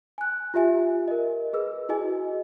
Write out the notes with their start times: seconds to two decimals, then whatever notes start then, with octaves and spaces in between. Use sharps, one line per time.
0.18 G#5 F#6
0.54 F4 G4 E5 G#5
1.08 A#4 D#5
1.53 G#4 B4 E6
1.89 E4 F#4 G#4 D#5 G#5